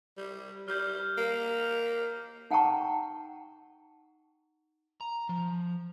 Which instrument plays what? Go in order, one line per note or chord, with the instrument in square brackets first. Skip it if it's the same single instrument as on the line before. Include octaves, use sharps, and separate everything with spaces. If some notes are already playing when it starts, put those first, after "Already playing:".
[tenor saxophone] G3
[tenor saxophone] G3 [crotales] F6 G6
[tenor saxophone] A#3
[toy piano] D#4 F#5 G5 A5 A#5 C#6
[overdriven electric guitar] A#5
F3